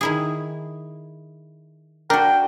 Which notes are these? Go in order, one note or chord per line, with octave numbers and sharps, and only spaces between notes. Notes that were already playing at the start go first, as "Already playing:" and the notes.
D#3 E4 G#4
D4 F#4 A#4 G5